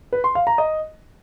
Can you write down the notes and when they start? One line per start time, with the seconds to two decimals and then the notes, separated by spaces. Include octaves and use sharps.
0.13 B4
0.24 C6
0.35 F5
0.47 A#5
0.58 D#5